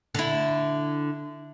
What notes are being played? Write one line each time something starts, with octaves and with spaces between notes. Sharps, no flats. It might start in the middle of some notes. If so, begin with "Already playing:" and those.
D3 E4